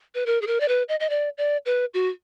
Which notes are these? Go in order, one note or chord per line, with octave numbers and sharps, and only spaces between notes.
B4
A#4
G#4
A#4
D5
B4
D#5
D#5
D5
D5
B4
F#4